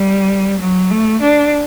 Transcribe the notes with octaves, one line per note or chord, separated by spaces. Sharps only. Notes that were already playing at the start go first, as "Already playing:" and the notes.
Already playing: G3
F#3
A3
D4